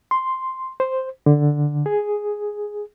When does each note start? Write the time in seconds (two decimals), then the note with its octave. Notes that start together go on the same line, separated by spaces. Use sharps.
0.11 C6
0.80 C5
1.26 D3
1.86 G#4